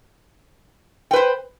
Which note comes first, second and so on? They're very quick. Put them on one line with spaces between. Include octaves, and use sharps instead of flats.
G5 B4 C5